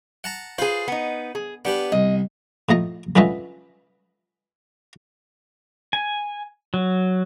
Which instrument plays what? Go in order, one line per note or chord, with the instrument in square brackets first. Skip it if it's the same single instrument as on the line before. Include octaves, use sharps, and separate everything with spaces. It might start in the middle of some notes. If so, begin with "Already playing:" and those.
[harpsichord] F#5 A5 A#5
[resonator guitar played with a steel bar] F4 G#4 [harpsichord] B4 C5
[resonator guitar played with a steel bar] B3 D#4
G#4
[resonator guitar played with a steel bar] B3 [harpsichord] D4 G4 B4
[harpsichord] C2 [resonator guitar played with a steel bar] D#5
[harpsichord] A2 F3 D#5 A#5
D3 C#4 F4 B4 D#5 E5
[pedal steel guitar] G#5
F#3